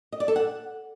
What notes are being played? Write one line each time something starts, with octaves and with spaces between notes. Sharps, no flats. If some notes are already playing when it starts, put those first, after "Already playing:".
D#5
D5
A4
F#5